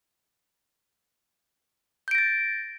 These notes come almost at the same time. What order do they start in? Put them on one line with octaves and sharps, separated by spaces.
G6 D7 A#6 A6